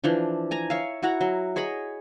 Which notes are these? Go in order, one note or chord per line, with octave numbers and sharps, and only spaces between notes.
E3 F3 D4
G#5 A#5
C#5 E5 F5
E4 F#4 F#5 A#5
F#3
G#4 C#5 D#5 B5